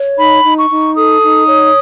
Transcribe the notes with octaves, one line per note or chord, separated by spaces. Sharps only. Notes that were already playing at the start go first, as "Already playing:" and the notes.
Already playing: C#5
D#4 B5
D#4
C#6
D#4
A4 D#6
D#4
C#5